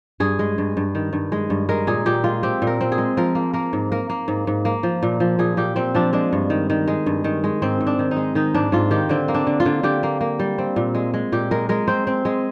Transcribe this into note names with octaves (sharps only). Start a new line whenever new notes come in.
G2 G#4
G#3
G2
G2
D#3
G2
G#3
G2
G#3 A#4
A#2 G#4
A#2 G4
G#3 F4
C4 G4
A#2
A#4
C4
G#4
G#3
F3 A#4
A#3
A#3 A#4
G#2
A#3 A#4
A#3
G#2
G#2
A#3
F3
A#2
F3
A#2 G#4
A#2 G4
A#2 C4
F3 D4
G#3 D4
G2
D#3
D#3
G#3
G2
D#3
G#3
G#2 C4
G#2
D4
D#3
D#4
G#3
D#3 D#4
G#2 D4
G#2 F4
D#3 G4
D3 C4
A#3
D4
D3
F4
D3
D3 G4
A#3
A#3
G3
C4
A#2
G#3
G#3
A#2 G4
G#3 A#4
G#3 A#4
C4 C5
C4
G#3